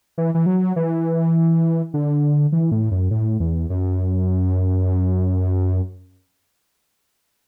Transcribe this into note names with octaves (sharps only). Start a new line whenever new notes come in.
E3
E3
F#3
E3
D3
E3
A2
F#2
A2
E2
F#2